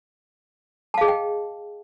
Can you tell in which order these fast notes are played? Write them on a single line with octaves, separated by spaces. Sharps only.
A5 F5 G#4 D#5 G5